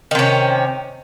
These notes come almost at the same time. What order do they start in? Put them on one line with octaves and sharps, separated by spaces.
D#3 C3 C#4